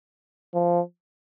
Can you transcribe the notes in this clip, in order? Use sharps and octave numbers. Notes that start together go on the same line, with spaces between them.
F3